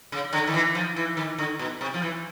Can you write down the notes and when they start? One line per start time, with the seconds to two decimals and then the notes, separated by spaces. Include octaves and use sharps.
0.12 C#3
0.33 D3
0.47 D#3
0.54 E3
0.75 F3
0.96 E3
1.17 D#3
1.38 D3
1.59 B2
1.81 C3
1.94 F3
2.02 E3